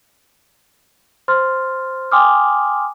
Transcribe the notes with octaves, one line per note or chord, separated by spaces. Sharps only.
C5 C6 F6 A6
G5 G#5 C6 D6 D#6 F6